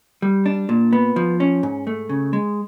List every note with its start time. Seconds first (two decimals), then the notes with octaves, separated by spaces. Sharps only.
0.22 G3
0.46 D4
0.69 A#2
0.93 B3
1.16 F3
1.40 C#4
1.63 G#2
1.87 A3
2.09 C#3
2.33 G#3